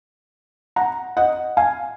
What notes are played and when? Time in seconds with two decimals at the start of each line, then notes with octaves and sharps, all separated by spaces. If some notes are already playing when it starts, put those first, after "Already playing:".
0.76 F#5 A#5
1.17 D#5 F#5
1.57 F5 G#5